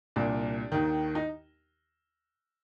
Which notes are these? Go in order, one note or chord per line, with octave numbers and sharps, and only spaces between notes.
C2 A#2 D4
D#2 D#3
D#4